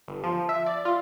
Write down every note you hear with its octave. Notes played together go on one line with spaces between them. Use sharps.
G1
F3
E5
D5
F4